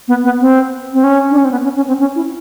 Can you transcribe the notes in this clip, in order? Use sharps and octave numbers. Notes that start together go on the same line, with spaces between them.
B3
B3
C4
C4
C#4
D4
C#4
C4
B3
C#4
C#4
C4
C#4
E4